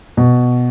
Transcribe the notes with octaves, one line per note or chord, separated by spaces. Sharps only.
B2